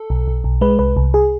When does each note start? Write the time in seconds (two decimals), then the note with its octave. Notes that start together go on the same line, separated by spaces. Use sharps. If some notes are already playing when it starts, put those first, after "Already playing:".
Already playing: A4
0.10 B1
0.28 B1
0.44 B1
0.61 G#3 B4
0.79 C2 B4
0.96 C2
1.14 G#4